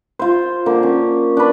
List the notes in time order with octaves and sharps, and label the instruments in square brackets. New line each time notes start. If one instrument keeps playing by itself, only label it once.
[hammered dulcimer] F4 C5
D3 A#3
C#4
D4 B4